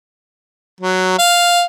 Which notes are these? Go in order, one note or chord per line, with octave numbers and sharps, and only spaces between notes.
F#3
F5